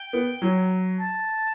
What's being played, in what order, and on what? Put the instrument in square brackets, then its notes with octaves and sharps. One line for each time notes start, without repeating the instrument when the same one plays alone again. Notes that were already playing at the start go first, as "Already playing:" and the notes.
Already playing: [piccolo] G5
[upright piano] B3
F#3
[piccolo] A5